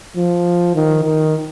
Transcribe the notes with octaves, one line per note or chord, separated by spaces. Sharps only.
F3
D#3
D#3